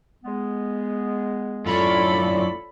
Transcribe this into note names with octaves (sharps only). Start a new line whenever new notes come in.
G#3 B3
F#2 A2 F4 A4 C#5 D5 B5